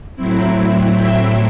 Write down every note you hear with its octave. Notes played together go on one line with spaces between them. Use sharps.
A2 F#3 C4 E4
E5 G5